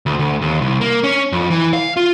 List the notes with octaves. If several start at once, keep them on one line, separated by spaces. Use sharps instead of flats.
D2
D2
D#2
C2
A#3
C#4
F2
E3
F5
F4